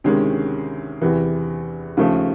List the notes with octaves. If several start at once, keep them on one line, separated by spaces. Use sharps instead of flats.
D2 C3 D#3 G#3 C#4
E2 C3 E3
D#2 C#3 F3 A3